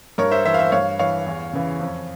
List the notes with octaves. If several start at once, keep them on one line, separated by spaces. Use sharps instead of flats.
G2 A#4 C#5
C5 E5
E3 C5 E5
F5
C5 E5
G2 C#5 F5
E3 C#5 F5
E2
C#3 E3
F2